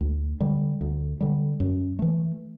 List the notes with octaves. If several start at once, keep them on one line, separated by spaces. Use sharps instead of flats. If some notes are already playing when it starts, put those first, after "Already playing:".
D2
D3 G3
D2
D3 G3
F#2
E3 A3